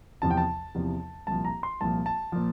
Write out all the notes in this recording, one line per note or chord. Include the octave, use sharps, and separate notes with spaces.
E2 C3 F3 A5
G5
A5
E2 C3 F3
C2 A#2 F3 A5
A#5
C6
C2 A#2 F3 A5
A5
A#2 F3